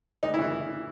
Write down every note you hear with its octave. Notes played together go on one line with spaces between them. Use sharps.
D2 D#4
E4
C#3 E3